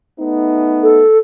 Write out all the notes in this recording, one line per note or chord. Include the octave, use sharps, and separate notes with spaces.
A3 B3 D#4
A4